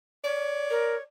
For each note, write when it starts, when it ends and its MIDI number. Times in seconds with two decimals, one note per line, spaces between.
0.24 1.03 73
0.24 1.04 74
0.70 0.95 70